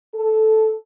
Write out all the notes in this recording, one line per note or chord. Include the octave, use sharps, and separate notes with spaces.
A4